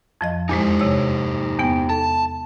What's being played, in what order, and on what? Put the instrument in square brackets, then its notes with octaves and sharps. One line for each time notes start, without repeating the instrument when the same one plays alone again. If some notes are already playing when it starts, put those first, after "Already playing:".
[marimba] F2 F3 D#5
[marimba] E2 A#2 G#3 [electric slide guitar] D#4 G4 C5
[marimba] C3 C#5
E2 B3 G5
[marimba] A4 [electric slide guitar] A5